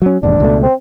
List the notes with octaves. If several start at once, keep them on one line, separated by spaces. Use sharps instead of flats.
F#3 C#4
E1 D#2 G#2 D4
C#2 B2 A3
C4